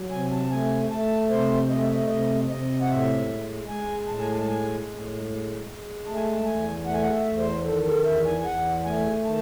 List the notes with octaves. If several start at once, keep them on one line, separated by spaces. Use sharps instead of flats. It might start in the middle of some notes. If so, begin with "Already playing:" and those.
Already playing: F#3
C3 G#5
A5
A3 G#5
A3 A5
C3 C5
A3 D#5
E5
D#5
C3 D#5
C3 D#5
F#5
A2 E5
G#3
G#3 G#5
A2 A5
G#5
A5
A5
G#3 G#5
A2
G#3
G#3
A3 A5
G#5
A5
E2 G#5
A3 F#5
G#5
F#5
E5
E2
C5
D#3 A4
A4
E2 E5
G#5
G#5
E2 F#5
A3 G#5
D#3 A5